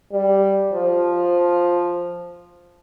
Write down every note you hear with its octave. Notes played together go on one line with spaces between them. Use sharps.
G3
F3